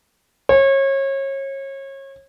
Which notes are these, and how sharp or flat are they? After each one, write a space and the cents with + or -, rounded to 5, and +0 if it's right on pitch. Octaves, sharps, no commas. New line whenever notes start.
C#5 -30